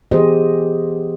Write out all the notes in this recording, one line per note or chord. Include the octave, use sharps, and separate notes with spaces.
E3 B3 G4 G#4 C5 D#5